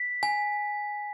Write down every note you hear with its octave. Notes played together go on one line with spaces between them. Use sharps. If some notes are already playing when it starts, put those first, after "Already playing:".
Already playing: B6
G#5